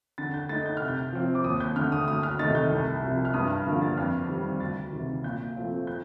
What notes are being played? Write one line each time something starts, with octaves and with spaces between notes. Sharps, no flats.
D3 A6
G6
A3 D#4 A6
G6
C3 F6
G6
F3 C4
D6
D#2 D#6
G6
D3 A3 F6
D#6
D2 D#6
F6
C3 D#3 A3 D#4 A6
G6
C2
C3 F3
F6
G2 D#6
F6
D3 F3 A#3
A6
F2 F6
D#3 G3 C4
D2 A6
C3 D#3
A#2 G6
F3 A3 C4 F4
G6